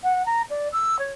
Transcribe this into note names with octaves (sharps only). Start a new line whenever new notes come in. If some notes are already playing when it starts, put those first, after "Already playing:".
F#5
A#5
D5
E6
C#5